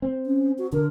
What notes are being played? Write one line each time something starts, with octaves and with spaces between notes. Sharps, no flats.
C4
C#4
F#4
D3 A#4